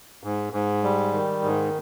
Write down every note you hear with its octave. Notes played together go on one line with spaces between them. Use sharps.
G#2
G#2
G3
D#3
G#2